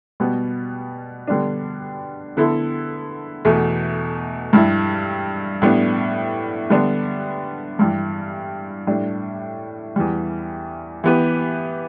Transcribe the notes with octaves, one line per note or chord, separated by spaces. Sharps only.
B2 G3 B3
D3 G3 B3 D4
D3 B3 E4 A4
E2 B2 A3
G2 G3 E4
A2 G3 B3 D4
D3 G3 B3 D4
G2 E3 G3
A2 G3 D4
E2 E3 G3
E3 B3 G4 B4